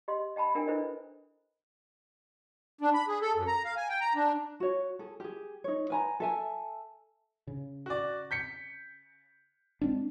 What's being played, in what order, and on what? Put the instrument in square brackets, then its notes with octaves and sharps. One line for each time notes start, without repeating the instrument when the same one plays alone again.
[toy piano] G4 D#5 C6
D#5 G5 A5 B5
D4 E4 A#4 G5 G#5
D4 E4 A4 B4 C5 D#5
[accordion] D4
B5
G#4
A4
F#2
A#5
F5
G#5
G5
A#5
D4
[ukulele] F#4 C#5
G#4 A4
G4 G#4
D#4 C#5
B4 G#5 A#5
A4 E5 G#5
[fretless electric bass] C#3
[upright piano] F#4 D5
G6 B6 C#7
[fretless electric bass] G#3 C4 D4